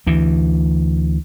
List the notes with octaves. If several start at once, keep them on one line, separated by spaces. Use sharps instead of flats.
D2 E3